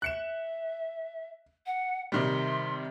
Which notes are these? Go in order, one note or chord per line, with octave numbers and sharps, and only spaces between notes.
E5 F#6 C#7 E7
F#5
C3 D#3 G3 C6